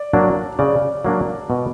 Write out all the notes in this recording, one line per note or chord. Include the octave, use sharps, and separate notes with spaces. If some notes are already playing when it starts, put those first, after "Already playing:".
Already playing: D5
F#3 A#3 D4
C#3 D5
F#3 A#3 D4
B2